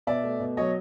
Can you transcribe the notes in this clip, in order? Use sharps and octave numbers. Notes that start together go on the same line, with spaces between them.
B2 D5 E5
A3
B2
F#3 C#5 D#5